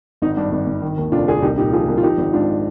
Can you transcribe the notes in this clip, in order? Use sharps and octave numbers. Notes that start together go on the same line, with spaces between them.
G#1 D#4
G2 D4
G#1
G#1
D#3
D#2
F1 D4 F4
D#2 F4 G#4
C2 D#4 G4
A#2 D#4 G4
F3 F4 G#4
C2
F4
F3 D#4 G4
G#1
G#2 D4 F4